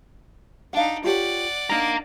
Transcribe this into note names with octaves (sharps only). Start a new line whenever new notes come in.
D4 D#4 F5 F#5
F4 G4 C#5 D5 F#5
D4 D#4 A#4 F5 A#5